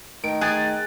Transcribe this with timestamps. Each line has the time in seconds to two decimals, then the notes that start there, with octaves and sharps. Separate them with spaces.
0.24 D#3 A3 D7
0.41 G#4 F#6 A6